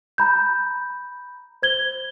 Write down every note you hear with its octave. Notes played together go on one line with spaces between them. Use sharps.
A#5 B5 G6
C5 G#6 G7